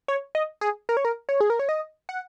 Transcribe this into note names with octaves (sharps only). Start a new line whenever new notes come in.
C#5
D#5
G#4
A#4
C#5
A#4
C#5
G#4
A#4
C#5
D#5
F#5